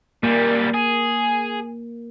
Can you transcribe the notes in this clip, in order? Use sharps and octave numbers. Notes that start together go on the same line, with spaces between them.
A#2 G3 A#3
G#4